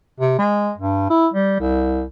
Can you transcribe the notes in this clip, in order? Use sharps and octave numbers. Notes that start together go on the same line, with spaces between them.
C3
G#3
G2
E4
G3
C2